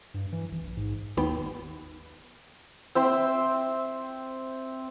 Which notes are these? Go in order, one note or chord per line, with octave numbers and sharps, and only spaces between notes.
G2
E3
G#1
A#1
G#2
G#1 D#2 B3 G5
C4 C5 E5 G5